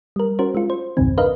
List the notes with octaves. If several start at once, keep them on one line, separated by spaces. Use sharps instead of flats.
G3 A#4
C#4 F#4 A#4 C5
G#3 F4
C5
B1 E2 G2 C3 D#3 C4
D4 A#4 B4 D#5 F5